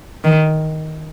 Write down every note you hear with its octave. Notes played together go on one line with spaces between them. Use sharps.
D#3